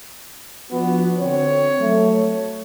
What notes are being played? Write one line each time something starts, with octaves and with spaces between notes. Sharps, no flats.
F3 B3 D4 F#4
D3 C4 C#5
F#3 A3